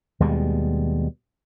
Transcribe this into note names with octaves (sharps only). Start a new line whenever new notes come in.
D#2 B2 G3 G#3